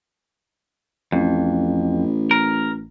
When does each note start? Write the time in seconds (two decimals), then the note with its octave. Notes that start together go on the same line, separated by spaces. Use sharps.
1.12 A1 F2
2.31 A#4